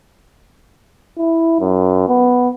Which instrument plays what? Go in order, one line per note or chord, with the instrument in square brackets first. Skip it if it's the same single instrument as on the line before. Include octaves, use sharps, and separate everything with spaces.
[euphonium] E4
F#2
B3